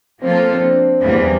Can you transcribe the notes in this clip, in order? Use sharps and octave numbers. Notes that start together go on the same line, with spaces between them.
F3 A#3 C4 F4 A4
C4
D4
E2 E3 G3 A#3